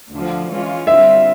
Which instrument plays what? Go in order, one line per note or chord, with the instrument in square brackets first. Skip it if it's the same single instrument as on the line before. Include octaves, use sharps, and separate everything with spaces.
[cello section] D2 D3 F3
E3 G#3 C#4 F4
[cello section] D3 G3 C4 F4 [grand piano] E5